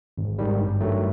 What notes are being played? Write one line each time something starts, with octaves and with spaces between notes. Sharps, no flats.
G#1
G#2 D#3 G3
G2
D#3 F#3 A3